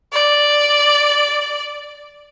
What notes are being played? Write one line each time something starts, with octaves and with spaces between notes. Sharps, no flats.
D5